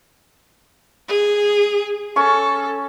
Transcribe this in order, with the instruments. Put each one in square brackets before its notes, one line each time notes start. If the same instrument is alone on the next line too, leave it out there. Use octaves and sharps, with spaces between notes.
[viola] G#4
[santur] C#4 C#6 [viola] A4